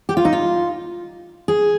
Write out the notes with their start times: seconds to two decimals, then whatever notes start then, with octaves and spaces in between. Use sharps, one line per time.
0.09 G4
0.17 F4
0.25 D#4
0.33 F4
1.48 G#4